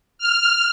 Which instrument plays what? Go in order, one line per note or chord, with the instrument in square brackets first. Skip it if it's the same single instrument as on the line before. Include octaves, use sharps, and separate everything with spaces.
[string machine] F6